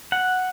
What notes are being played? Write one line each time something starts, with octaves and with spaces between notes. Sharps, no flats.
F#5